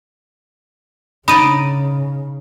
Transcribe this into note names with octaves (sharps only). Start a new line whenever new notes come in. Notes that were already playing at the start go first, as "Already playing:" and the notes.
C#3 D#4 D5 B5 D#7